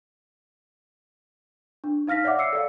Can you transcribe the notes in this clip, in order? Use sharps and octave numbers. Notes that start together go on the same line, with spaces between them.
D4
D#4 F5 F6 A#6 B6
C#5 D5 E5 F#5 D6
E6 C7 C#7
A4 D5 F5